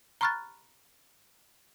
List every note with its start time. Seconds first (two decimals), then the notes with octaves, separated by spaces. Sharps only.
0.21 A#5 B5 C#6 F6 F#6 A6